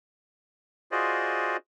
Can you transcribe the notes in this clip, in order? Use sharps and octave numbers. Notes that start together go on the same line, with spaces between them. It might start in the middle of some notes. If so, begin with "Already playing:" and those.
F4 F#4 G#4 C5 D5 D#5